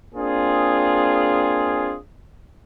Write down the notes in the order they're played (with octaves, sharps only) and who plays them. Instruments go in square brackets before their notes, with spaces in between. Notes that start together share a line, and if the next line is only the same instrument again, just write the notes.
[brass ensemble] A#3 C4 D4 F4 G#4